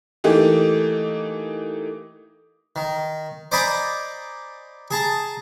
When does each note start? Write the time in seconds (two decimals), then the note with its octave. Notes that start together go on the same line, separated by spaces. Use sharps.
0.24 E3 A3 A#3 D#4 G4
2.76 D#3
3.52 C5 D5 D#5 G#5 A#5 B5
4.91 G#4 A5 A#5